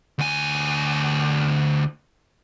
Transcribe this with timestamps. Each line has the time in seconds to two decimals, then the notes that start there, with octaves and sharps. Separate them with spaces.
0.19 D2 G#5